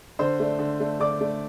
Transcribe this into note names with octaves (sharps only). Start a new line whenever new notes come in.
D3 C5 C6
A3 D4
D3
A3 D4
D3 D5 D6
A3 D4